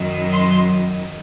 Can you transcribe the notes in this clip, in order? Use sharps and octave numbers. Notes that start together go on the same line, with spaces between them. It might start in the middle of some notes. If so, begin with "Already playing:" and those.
Already playing: F#2 D#3 F#3
C6